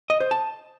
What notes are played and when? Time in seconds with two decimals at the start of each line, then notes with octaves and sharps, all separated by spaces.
0.10 D#5
0.20 C5
0.31 A5